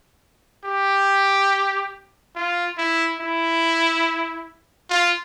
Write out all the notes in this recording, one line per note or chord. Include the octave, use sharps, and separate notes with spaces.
G4
F4
E4
E4
F4